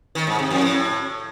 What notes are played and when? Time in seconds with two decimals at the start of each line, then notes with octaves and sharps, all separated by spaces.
0.15 D#3
0.27 G#2
0.39 C3
0.50 F2
0.62 A2